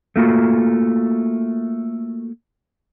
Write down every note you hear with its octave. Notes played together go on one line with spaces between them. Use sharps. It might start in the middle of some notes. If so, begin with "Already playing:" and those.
A3 A#3 F4 F#4